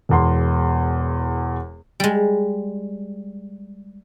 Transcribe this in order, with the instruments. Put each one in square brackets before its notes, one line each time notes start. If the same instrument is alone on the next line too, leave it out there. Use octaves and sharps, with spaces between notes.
[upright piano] E1 E2 C6
[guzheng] G3 G#3